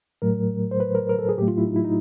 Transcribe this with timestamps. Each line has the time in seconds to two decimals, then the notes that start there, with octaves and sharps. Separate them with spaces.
0.22 A2 F#3 A3 A#4
0.71 C5
0.80 B4
0.95 A#4
1.09 A#4
1.19 A4
1.29 G#4
1.38 A2 F#3 A3 G4
1.48 F4
1.58 E4
1.67 D#4
1.76 E4
1.84 D#4